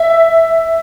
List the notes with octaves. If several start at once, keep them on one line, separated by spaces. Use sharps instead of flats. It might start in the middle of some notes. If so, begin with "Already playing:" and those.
Already playing: E5